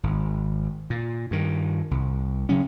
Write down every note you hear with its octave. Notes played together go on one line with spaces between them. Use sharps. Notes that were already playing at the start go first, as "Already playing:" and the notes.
G#1
A#2
G2 D#3
C2
C#3 F#3 C#4